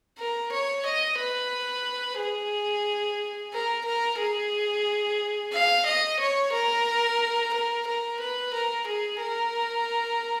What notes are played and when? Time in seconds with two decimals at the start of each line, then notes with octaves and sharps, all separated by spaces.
0.18 A#4
0.52 C#5
0.86 D#5
1.18 B4
2.18 G#4
3.53 A#4
3.85 A#4
4.19 G#4
5.52 F5
5.86 D#5
6.20 C#5
6.53 A#4
7.53 A#4
7.87 A#4
8.20 B4
8.54 A#4
8.87 G#4
9.20 A#4